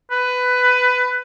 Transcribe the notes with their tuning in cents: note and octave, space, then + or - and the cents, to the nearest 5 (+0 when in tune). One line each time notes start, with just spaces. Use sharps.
B4 +15